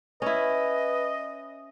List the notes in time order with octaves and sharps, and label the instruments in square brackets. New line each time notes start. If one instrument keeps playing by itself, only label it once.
[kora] C#4 E4 [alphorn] B4 [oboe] D#5